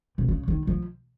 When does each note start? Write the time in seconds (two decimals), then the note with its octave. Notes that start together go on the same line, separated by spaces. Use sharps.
0.18 C3
0.28 C#3
0.48 D#3
0.67 F3